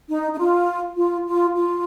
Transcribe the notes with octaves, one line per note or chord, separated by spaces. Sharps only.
D#4
D#4
F4
F4
F4
F4